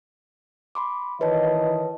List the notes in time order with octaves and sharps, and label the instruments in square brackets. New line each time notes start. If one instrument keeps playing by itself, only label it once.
[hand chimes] B5 C6 D6
[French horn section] D#3 E3 D#5 [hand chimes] B4 C#5 A5